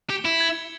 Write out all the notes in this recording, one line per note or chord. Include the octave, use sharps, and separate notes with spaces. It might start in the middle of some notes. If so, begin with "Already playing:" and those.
G4 C#7 E7 G7
E4
G#6